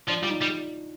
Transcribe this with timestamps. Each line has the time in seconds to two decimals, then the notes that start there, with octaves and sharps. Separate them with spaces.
0.09 F3 D4
0.22 G3 F4
0.30 D#4
0.42 G3